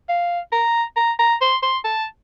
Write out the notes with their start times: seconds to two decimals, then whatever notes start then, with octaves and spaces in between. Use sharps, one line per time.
0.09 F5
0.52 A#5
0.96 A#5
1.19 A#5
1.41 C6
1.63 C6
1.85 A5